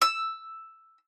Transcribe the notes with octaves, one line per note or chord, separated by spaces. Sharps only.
E6